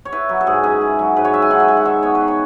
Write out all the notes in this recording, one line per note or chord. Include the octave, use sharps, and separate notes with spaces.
C#5
E4 B4
F#3
A4
G#2 G#4
C#4 G#4
E4
F#3
G#2 B4
C#5
C#4 E5
G#5
D#3 F#5
E5
G#3 G#5
F#5
D#3 E5
B3 C#5
B4
D#3
C#5